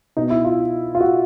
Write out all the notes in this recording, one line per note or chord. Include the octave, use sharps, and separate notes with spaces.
B2 D#4
E4
F4
F4
F#4